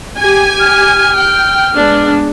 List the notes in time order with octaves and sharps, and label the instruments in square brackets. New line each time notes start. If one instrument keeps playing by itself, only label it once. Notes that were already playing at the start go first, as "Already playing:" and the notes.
[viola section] G4 G#5
[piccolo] F6
[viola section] G5
G#3 B3 D4